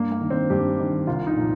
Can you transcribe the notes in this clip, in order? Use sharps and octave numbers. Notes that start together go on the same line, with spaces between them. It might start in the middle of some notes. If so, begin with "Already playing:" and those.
Already playing: G2 A#3
A#3
D#3
C4
G2 G4
D#3
C2 F4
D#4
A#2 F3